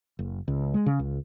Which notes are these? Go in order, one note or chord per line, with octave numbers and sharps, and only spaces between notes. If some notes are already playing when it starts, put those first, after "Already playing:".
F#1
C#2
G#3
C#3
C#2